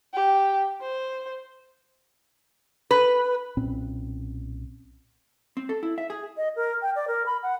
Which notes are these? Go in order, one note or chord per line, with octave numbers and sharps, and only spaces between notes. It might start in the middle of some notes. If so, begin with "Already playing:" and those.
G4
C5
B4
B1 A#2 C4 C#4
C4
A4
E4
E5
G#4
D#5
A#4
G5
D5
A#4
B5
F#5